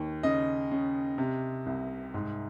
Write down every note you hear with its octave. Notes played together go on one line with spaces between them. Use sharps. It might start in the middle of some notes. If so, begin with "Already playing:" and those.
Already playing: D#2
C#3 D#5
C#3
C3
C2
G#2